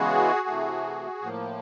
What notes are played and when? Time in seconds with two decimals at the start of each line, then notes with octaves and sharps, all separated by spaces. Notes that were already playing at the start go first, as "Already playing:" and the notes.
Already playing: C#3 E3 G#3 B3 F#4 G#4
0.47 C3 E3 A3
1.22 A2 F3 A#3